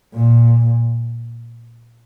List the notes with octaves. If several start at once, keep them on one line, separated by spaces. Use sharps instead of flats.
A#2